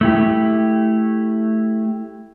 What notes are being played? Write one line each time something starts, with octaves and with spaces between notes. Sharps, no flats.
A3 E4 G4